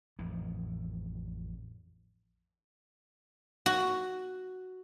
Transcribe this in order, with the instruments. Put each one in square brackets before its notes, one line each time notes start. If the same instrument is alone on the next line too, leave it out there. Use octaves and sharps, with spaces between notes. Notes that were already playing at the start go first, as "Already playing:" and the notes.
[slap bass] A1 F2 D#3
[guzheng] F#4